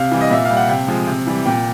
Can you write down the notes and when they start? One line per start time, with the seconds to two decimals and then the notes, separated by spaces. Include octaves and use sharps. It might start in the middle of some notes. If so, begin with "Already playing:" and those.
Already playing: C3 F5
0.11 E3 G3
0.21 D#5
0.30 A#2 E5
0.45 G3 F5
0.57 F#5
0.69 C3 G5
0.88 F3 G#3
1.07 C3
1.27 E3 G3
1.46 A#2 G5